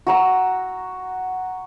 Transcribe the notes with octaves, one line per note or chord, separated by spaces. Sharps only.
F#4 A#5 E6